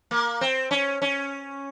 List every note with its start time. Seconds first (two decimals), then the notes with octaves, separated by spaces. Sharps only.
0.11 A#3
0.41 C4
0.71 C#4
1.02 C#4